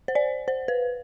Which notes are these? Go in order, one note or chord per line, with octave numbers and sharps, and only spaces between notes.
C5
D5
C5
B4